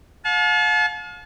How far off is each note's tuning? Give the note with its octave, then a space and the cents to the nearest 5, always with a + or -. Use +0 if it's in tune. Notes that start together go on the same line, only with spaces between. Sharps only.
F5 +40 A5 -35